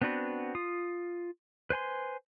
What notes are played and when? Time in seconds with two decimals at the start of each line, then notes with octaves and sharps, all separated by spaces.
0.02 B3 C4 D4 F#4 B4
0.55 F4 D#6
1.70 B4 C5 G#5 C6